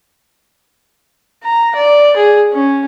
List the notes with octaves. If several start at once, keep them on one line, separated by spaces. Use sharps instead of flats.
A#5
D5
G#4
C#4